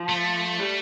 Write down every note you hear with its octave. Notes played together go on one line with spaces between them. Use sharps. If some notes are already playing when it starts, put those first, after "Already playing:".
Already playing: F3
A3
G3